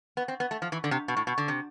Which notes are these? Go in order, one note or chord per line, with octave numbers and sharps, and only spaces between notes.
B3
C4
B3
A3
F3
E3
D3
C3
B2
A2
B2
D3
C3